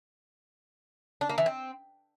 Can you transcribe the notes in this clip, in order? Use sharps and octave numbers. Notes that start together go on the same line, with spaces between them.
D4
A#3
E3
C4